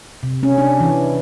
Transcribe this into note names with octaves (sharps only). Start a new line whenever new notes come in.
C3
C#4
D4
E3